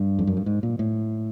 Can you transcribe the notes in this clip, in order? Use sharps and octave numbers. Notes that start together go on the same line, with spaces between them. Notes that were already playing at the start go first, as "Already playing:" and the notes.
Already playing: G2
F2
F#2
G2
G#2
A#2
A2